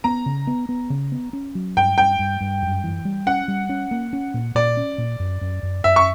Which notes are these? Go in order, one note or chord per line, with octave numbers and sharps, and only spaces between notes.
B3 A#5
C#3
B3
B3
C#3
B3
C#4
F#3
G2 G5
G2 G5
G2
G2
F#2
E3
G3
C#4 F#5
G3
C#4
A#3
C#4
A#2
A#2 D5
C#4
A#2
F#2
F#2
F#2
F#2 E5
C#6